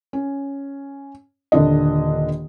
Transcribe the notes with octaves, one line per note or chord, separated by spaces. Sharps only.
C#4
D#1 D3 D4 D#5